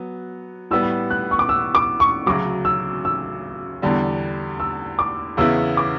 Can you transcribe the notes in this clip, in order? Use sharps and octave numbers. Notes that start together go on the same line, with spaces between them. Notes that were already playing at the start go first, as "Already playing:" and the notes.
Already playing: F#3 B3
A2 G3 B3 E6
F#6
C#6
D6
E6
D6
C#6
D2 C#3 F#3 D6
E6
E6
E2 D3 G3
E6
D6
E2 C#3 E3 B3 E4 E6
D6